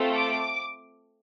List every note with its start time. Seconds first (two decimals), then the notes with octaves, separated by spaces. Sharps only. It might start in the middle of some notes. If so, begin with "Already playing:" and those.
Already playing: A3 C4 F4 A4
0.16 D6